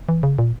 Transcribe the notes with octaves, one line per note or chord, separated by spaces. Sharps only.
E3
C#3
A#2